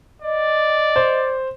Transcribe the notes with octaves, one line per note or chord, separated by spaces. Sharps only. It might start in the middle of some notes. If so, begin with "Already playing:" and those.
D5 D#5
C5